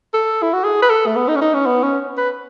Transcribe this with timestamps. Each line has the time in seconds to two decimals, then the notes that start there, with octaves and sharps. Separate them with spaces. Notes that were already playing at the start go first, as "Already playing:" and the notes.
0.14 A4
0.42 E4
0.53 F#4
0.64 G#4
0.82 B4
0.90 A4
1.06 A3
1.16 B3
1.28 D#4
1.36 C#4
1.41 D#4
1.54 C#4
1.66 B3
1.83 C#4
2.17 B4